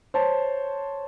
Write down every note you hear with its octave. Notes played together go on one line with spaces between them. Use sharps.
C5 C#5 A5